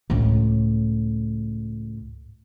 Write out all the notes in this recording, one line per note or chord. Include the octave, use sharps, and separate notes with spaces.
C#2 A2